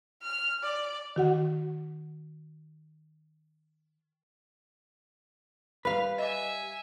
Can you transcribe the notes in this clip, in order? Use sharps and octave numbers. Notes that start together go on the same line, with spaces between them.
F6
D5
D#3 F#4 F#5
G3 B4 F5
D#5 E5 G#5 D6